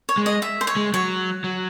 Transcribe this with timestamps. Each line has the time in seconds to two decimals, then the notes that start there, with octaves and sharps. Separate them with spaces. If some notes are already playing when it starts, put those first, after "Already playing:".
0.09 C#5
0.18 G#3
0.26 D#5
0.42 E5
0.61 C5
0.67 C#5
0.76 G#3
0.94 F#3 C#5
1.44 F#3